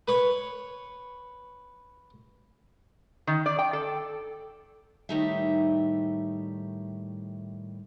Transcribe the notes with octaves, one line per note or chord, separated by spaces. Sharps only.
B4 C#5
D#3
D5
G5
A4
A2 D#3 G3 D#4 G4 E5